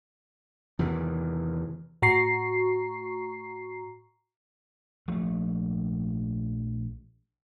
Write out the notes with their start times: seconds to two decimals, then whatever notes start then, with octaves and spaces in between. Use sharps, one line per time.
0.79 E2 C3 D#3 E3
2.02 A2 F#4 A#5 C#6 C7
5.08 A#1 F3 A3